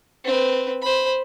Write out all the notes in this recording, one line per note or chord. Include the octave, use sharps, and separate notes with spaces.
C4 B4
C5 B5